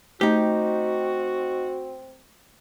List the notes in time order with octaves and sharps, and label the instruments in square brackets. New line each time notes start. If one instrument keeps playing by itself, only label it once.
[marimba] A3 [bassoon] C4 [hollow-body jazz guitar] D#4 G4 [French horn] F#4